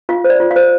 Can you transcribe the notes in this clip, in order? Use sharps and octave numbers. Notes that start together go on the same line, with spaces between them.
F4 F5
C5
D5
F4
F5
C5